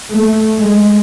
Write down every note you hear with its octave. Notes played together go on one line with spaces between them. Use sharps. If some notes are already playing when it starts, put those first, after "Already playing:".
A3
G#3